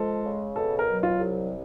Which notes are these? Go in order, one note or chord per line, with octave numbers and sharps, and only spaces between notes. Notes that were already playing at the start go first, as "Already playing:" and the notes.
Already playing: F3 G#3 A4
C#3
B2 A4
A#4
F#3
F4
C2